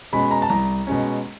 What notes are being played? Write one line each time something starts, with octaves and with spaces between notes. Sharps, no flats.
B2 G#3 C#4 B5
A#5
A5
C2 A#5
B2 G#3 C#4